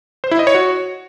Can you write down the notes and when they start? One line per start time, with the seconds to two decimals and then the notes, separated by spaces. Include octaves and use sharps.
0.24 C5
0.31 E4
0.39 D#5
0.47 C#5
0.55 F#4